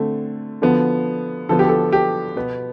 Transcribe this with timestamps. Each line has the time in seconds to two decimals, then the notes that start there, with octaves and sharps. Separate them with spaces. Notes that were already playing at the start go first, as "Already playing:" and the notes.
Already playing: D3 A3 C4
0.62 D3 F3 B3
1.49 D3 F3 B3 A4
1.59 G4
1.69 A4
1.93 G4
2.36 B2 B3